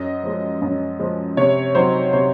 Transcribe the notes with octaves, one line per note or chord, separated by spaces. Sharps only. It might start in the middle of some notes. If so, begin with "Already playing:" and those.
Already playing: F#2 D#5
F3 G#3
F#2
F3 G#3
C3 C#5
F#3 C4 D#4 C5
C3 C5